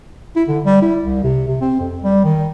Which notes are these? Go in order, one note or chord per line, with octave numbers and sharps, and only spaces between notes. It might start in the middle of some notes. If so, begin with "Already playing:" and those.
E4
D3
G3
E4
C2
C3
C3
C4
F2
G3
D#3